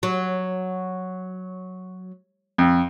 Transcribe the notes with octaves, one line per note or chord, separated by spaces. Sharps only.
F#3
F2